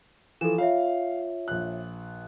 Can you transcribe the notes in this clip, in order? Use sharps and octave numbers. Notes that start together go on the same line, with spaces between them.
E3 F3 A4 E7
F4 C#5 E5 F5
A#1 F#6